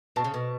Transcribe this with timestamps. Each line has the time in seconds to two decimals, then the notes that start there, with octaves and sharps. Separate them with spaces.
0.16 B2 A5
0.24 C#3
0.34 B2